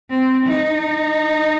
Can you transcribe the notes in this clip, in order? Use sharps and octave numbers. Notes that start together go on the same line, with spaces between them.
C4
D#4